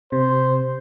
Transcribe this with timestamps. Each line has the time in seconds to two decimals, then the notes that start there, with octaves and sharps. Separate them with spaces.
0.12 C3 C5